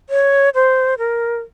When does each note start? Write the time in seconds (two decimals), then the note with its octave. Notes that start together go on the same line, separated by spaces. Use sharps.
0.10 C#5
0.55 C5
0.98 A#4